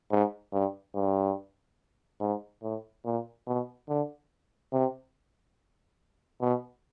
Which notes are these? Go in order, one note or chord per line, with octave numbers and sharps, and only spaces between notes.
G#2
G2
G2
G#2
A2
A#2
B2
D3
C3
B2